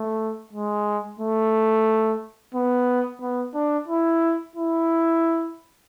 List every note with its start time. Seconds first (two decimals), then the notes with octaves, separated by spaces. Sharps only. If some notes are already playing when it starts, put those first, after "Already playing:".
Already playing: A3
0.53 G#3
1.20 A3
2.55 B3
3.21 B3
3.54 D4
3.88 E4
4.56 E4